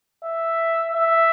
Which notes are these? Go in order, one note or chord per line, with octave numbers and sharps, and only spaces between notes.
E5
E5